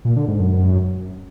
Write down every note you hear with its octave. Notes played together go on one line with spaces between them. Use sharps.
A#2
D3
G#2
F#2
F#2